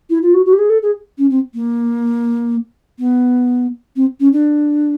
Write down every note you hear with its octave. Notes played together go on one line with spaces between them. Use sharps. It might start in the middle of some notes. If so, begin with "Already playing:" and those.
E4
F4
F#4
F#4
G4
G#4
A4
G#4
C#4
C4
A#3
B3
C4
C#4
D4